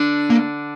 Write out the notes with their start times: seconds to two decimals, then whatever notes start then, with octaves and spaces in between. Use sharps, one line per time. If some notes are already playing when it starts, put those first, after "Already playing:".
Already playing: D3 D4
0.30 A#3